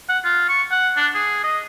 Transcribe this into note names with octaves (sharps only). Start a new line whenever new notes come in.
F#5
F4
C#6
F#5
D4
G#4
D#5